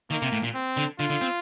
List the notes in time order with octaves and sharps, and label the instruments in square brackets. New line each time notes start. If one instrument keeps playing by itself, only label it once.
[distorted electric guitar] D#3 [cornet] A#3
[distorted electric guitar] C3
A2
A#2
[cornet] C4
[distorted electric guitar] D3
[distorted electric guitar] D3 [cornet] F4
[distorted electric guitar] D3
C4